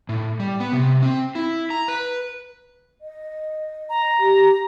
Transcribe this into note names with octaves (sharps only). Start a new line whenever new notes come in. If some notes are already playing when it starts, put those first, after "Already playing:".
A2
G3
B3
C3
C4
E4
A#5
B4
D#5
A#5
G4